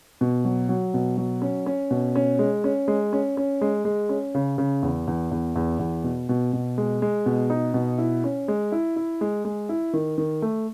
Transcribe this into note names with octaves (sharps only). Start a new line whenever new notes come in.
B2
F#3
F#3
B2
F#3
C#4
C#4
B2
C#4
G#3
C#4
G#3
C#4
C#4
G#3
G#3
C#4
C#3
C#3
E2
E2
E2
E2
E2
B2
B2
B2
G#3
G#3
B2
D#4
B2
E4
C#4
G#3
E4
E4
G#3
G#3
E4
D#3
D#3
A3